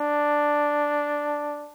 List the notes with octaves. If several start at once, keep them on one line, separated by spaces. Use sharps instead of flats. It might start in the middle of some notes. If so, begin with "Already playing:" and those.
Already playing: D4